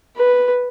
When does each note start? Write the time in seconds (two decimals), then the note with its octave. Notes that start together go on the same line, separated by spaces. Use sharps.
0.17 B4